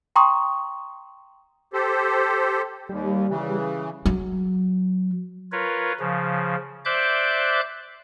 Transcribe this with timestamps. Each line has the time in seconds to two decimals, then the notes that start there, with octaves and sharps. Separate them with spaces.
0.16 G5 A#5 C6 C#6 D#6
1.73 G4 A4 C5
2.89 D#2 G3
3.29 C#3 E3
4.06 F#3
5.52 F4 A#4 B4 C#5
6.00 C#3 F3
6.85 C5 D5 E5 D6 F#6 G6